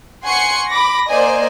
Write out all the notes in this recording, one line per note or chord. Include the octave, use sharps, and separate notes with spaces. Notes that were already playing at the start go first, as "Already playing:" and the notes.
F#5 G#5 C6 C#6 C7 C#7
B5 D6 A#6
A#3 C5 D5 D#5 G#5